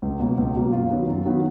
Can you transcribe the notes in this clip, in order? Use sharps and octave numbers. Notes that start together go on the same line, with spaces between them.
C#2
B2 F#3 A#3
C#2
B2 F#3 A#3
F#2 F4
D#3 F#3 B3
F#2
D#3 F#3 B3